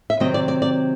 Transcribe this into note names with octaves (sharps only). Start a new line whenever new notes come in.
E5
C3 D#3 F#3 C4 D#5
D5
D5
D5